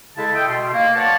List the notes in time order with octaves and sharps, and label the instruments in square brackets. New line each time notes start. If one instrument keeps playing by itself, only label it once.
[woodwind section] C#3 G#3 E4 A4 A5
A4 D#5 E5 G5
B2 C6
A#3
B4 C#5 D5 F#5 A5